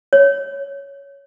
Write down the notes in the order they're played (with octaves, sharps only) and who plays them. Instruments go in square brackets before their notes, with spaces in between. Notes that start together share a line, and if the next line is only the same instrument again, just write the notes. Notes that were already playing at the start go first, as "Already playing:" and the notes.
[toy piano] C#5